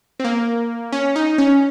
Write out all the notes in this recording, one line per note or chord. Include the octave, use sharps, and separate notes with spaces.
C4
A#3
C#4
D#4
C#4